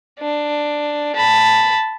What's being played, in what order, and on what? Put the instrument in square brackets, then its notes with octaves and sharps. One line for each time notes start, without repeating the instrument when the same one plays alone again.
[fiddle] D4
A5 B5